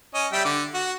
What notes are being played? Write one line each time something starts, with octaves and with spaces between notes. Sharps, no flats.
C#4 D#5
G3 E5 G5
D3 D6
F#4